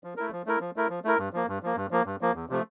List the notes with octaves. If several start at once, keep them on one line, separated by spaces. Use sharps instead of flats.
F3
A3 E4 A#4
F3
A3 E4 A#4
F3
A3 E4 A#4
F3
A3 E4 A#4
G2
F3 A#3
G2
F3 A#3
G2
F3 A#3
G2
F3 A#3
E2
C3 F3 A3